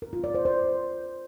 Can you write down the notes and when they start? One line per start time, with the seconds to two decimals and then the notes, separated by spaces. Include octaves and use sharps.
0.02 A#4
0.13 F4
0.24 D5
0.35 C5
0.45 C5